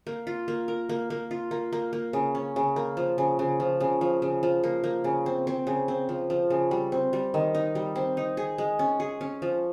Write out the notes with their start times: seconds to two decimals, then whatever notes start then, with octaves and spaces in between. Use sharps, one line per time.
0.07 A#3
0.27 F4
0.48 A#3
0.68 A#4
0.89 A#3
1.10 A#3
1.31 F4
1.51 A#3
1.72 A#3
1.93 A#3
2.13 C#3
2.35 C#4
2.56 C#3
2.76 A#3
2.97 F3
3.18 C#3
3.39 C#3
3.60 F3
3.80 C#3
4.01 F3
4.22 C#3
4.43 F3
4.64 A#3
4.84 A#3
5.04 C#3
5.26 C4
5.47 C4
5.67 C#3
5.88 C4
6.09 F3
6.30 F3
6.50 C#3
6.71 G3
6.92 C4
7.13 G3
7.34 D#3
7.55 D#4
7.75 G3
7.96 C4
8.17 D#4
8.37 G#4
8.58 G#3
8.79 C#4
9.00 G#4
9.21 C#4
9.42 F3